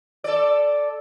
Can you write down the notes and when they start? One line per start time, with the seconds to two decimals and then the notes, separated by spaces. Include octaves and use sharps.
0.24 A4 D5